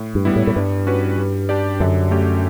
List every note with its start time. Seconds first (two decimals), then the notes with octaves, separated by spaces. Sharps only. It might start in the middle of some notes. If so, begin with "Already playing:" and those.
Already playing: A2
0.15 G2
0.25 G3 B3 E4
0.36 A2
0.47 A2
0.55 G2 G3
0.87 C#4 F#4 B4
1.18 G3
1.49 D4 G4 D5
1.80 F#2 D3
2.11 A3 C#4 G4